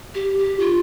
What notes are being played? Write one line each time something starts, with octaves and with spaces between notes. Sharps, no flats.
G4
G4
F4